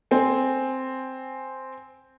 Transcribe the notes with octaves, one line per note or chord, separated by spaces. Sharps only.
C4 G#5